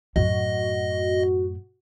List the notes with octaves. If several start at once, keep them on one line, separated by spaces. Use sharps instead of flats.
F#2 A2 F#4 D#5